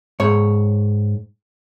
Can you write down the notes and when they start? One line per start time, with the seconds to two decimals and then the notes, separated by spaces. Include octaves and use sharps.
0.20 G#2 C#5